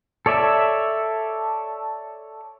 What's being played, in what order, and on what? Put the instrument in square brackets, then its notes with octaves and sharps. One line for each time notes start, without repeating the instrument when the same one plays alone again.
[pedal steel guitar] A4 C#5 D5 E5